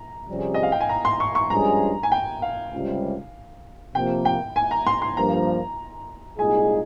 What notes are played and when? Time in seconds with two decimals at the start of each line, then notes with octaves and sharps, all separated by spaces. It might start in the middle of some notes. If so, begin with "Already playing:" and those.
Already playing: A#5
0.28 F2 C3 G3 C#4 G#4
0.54 D#5
0.63 F5
0.72 G5
0.80 G#5
0.89 A#5
1.05 C6
1.20 C#6
1.35 C#6
1.50 G2 F3 G#3 C#4 G#4 A#5
2.03 G#5
2.12 G5
2.42 F5
2.73 C#2 C3 G3
3.94 C3 F3 A#3 G5
4.25 G5
4.56 G#5
4.71 A#5
4.87 C6
5.02 C6
5.17 G2 F3 A#3 A#5
6.39 C2 A#2 G#3 D#4 G#4 G#5